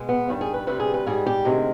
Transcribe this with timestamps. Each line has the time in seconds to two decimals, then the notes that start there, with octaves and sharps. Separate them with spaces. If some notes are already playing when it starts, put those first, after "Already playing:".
Already playing: B2 G#3
0.09 B3
0.28 G2 D#3 G3
0.41 G#4
0.54 B4
0.67 D2 C3 G3 B4
0.80 G#4
0.94 B4
1.06 G#2 G3 G#4
1.26 G4
1.45 D2 C3 D#3 G#3